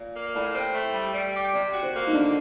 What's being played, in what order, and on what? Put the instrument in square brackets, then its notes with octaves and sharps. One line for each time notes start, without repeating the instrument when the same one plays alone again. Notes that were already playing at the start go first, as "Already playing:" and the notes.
Already playing: [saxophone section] A#2
A#3
[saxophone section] A2 [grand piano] D5
[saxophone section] C4
A3
G3
G3
G4
[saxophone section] C3 [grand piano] D5
[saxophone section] F#4
[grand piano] C5
[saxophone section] A#3
[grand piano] D#4
[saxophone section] D3 [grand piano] D4